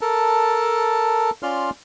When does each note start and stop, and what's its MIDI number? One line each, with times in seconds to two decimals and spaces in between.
0.01 1.30 69
0.01 1.30 70
0.01 1.30 81
1.43 1.70 61
1.43 1.70 65
1.43 1.70 74
1.43 1.70 84
1.43 1.70 89